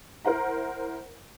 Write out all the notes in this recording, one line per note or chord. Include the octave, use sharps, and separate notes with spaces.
E4 A#4 C5 F#5 A#5